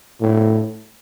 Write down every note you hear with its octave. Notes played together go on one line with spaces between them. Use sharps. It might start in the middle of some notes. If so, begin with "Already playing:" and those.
A2